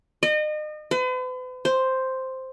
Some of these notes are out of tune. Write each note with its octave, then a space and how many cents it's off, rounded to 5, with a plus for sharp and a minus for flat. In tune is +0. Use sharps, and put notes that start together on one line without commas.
D#5 -35
B4 +45
C5 +0